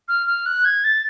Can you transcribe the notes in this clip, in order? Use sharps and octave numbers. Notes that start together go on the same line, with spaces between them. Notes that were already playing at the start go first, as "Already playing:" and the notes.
F6
F6
F#6
G#6
A6